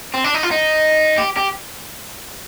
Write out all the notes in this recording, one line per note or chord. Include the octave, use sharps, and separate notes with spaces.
C4
D4
D#4
F4
D#4
G4
G4